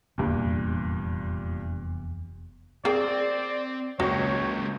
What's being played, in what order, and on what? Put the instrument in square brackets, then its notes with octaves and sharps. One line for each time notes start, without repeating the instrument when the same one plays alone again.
[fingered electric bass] F1 E2 [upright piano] G2 A#2
[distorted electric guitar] C4 [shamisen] G#4 A#4 G5 [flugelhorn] D5
[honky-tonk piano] C#2 C#6 A#6 [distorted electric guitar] G#3 A#3 [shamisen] F#4 [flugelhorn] C#5